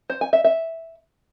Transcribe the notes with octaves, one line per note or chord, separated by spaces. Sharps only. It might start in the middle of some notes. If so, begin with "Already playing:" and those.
C5
G#5
E5
E5